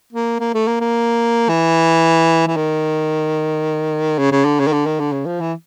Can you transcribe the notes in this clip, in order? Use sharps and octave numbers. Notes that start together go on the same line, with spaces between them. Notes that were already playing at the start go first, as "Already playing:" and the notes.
A#3
A#3
A3
A#3
A#3
E3
E3
D#3
C#3
C#3
D3
C#3
D#3
D3
D#3
D3
C#3
F3
E3